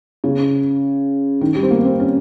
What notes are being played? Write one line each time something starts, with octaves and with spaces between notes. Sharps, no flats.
C#3
D#3
G3
C4
A#3
C4
C#4